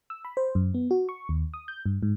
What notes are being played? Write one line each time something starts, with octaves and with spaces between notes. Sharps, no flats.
E6
B5
C5
F#2
B3
F#4
C#6
D#2
D#6
G6
G2
G#2